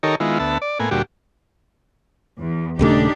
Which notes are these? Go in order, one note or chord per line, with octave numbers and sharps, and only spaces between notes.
D#3 D#4 G4 A4 A#4 C#5
D#3 G#3 B3 E4 F4
D2 B3 E5 A5
D5
A2 A#3 B3 G#5
D2 A#2 G3 F#4 G4
E2
D#1 C#3 A3 D4 D#4 G4